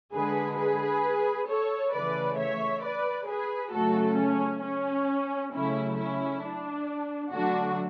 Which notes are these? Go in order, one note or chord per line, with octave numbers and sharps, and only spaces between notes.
D3 G#3 G#4 B4
G#4 B4
A4 C#5
C#3 E3 A3 B4 D5
C#5 E5
B4 D5
G#4 B4
C#3 F#3 A3 F#4 A4
C#4
C#4
C#3 F#3 A3 C#4 E4
C#4 E4
D4
D3 F#3 A3 D4 F#4